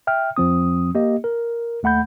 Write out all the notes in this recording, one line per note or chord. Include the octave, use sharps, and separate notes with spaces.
E5 G5 F6
F2 F3 C4 D#6
A#3 G4 D#5
A#4
D#2 A3 F#5 B5 G6